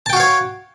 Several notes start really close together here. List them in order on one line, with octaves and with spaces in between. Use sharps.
A5 G5 F#4 F5 C#5